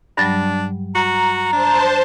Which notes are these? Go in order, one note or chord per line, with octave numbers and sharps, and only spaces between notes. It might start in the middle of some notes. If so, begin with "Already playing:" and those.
G2 F#3 G3 D4
F#4 A#5
D4 C5 A5